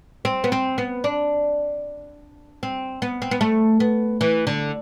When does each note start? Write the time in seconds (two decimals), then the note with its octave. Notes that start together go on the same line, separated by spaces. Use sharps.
0.25 C4
0.44 B3
0.52 C4
0.78 B3
1.04 D4
2.63 C4
3.02 B3
3.22 C4
3.31 B3
3.41 A3
3.80 B3
4.21 E3
4.47 D3